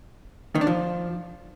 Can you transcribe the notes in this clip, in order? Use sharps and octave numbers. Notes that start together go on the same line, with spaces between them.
D#3
D4
F3